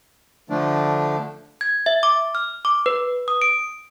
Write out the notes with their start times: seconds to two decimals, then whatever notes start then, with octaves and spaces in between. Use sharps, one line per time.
0.50 D3 F3 A3 D4
1.61 G#6
1.86 E5
2.03 D6
2.35 F6
2.65 D6
2.86 B4
3.28 D#6
3.42 D7